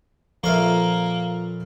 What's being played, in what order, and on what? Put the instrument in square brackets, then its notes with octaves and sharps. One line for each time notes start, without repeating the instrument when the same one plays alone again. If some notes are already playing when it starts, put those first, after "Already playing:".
[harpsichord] A#2 F5 C#6 [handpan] F3 [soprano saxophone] A#3 [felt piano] A4 B4 E5